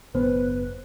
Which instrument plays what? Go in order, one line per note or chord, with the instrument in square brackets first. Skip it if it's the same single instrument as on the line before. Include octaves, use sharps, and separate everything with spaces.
[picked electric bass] F#1 B3 [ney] B4 [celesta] C5